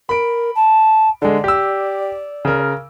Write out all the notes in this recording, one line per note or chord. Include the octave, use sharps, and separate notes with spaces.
A#4 B5 D7
A5
D3 G#3 D5
G4 E6
C#3 A#4